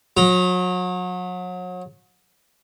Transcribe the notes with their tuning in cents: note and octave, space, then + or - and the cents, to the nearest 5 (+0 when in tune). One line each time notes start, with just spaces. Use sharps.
F#3 -35 A#5 +0